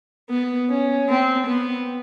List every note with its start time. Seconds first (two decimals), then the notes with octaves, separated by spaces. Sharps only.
0.30 B3
0.70 C#4
1.09 C4
1.47 B3